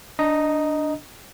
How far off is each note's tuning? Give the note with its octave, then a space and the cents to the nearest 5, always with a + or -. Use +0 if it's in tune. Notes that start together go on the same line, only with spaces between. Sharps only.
D4 +0 D#5 +0 A#5 +0